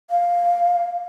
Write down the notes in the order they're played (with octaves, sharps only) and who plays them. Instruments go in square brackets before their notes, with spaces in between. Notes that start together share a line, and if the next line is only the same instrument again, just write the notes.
[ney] F5